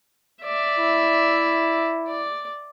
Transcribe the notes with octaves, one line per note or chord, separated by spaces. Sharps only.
D5 E5
E4
D5